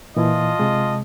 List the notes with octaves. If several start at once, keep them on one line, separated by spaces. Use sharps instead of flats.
A#2 E3 F4 D#5 A5
C3 G#3